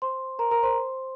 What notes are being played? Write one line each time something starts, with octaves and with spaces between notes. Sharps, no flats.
C5 C6
A#4 A#5
A#4 A#5
C5 C6